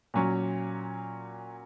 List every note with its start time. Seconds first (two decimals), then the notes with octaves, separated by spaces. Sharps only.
0.14 A#2 F#3 C#4